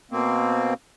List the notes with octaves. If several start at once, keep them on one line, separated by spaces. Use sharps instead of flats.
B2 A#3 C4